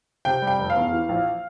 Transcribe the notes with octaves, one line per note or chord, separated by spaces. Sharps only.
C3 G5
G3
G5
F1
F5
E2
E3
A#1